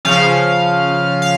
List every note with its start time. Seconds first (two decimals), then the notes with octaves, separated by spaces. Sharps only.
0.05 C#3 F3 C#4 F5
1.22 F5